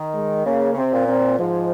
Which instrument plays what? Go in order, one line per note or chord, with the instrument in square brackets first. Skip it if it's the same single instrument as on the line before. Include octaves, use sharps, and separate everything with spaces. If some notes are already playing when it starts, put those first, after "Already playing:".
Already playing: [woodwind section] D#3
[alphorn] G#3
[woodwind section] C#3 [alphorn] A#3
[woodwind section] C#3
[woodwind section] C3 [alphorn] C4
[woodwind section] A#2
[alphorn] C4
[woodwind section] G#2 [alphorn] F3